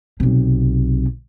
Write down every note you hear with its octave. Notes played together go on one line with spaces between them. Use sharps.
B1 C3